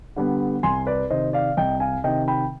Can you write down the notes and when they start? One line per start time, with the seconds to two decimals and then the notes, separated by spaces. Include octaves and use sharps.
0.16 D3 G3 B3
0.63 C2 G#5 C6
0.87 B4 D5
1.10 C3 D#3 C5 D#5
1.33 D5 F5
1.57 C2 D#5 G5
1.80 F5 G#5
2.04 C3 D#3 D#5 G5
2.28 G5 B5